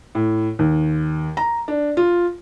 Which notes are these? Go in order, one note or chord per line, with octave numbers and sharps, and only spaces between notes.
A2
D#2
A#5
D4
F4